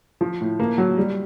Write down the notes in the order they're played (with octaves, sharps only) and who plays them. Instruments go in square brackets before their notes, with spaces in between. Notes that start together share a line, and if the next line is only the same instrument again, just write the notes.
[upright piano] F3
A2
A#3
F#3
G3